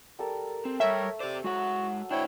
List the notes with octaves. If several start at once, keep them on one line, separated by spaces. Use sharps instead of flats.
G3 A4 A#4
C4
G3 A3 A#4 C#5 E5 G5
G4 C5 D5 D6
F#3 G#3 F#4 F#5 E6
D4 E4 C5 C#5 G5